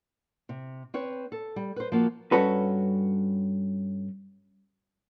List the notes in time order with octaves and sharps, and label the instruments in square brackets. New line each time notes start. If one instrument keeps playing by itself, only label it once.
[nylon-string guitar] C3
C4 B4 C#5
A4
G3
B4 C5
F3 A#3 F#4
[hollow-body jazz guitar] G2 C#4 F#4 A4 B4